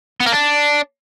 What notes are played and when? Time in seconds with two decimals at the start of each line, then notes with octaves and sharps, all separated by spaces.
0.20 B3
0.26 A#3
0.32 D4